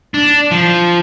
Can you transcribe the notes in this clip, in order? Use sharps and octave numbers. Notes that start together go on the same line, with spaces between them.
D4
F3